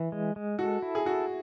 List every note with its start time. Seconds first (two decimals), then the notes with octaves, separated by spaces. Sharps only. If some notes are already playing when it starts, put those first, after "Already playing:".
Already playing: E3
0.12 G#3
0.36 G#3
0.59 F#4 A4
0.82 E4
0.95 G#4
1.06 F#4 A4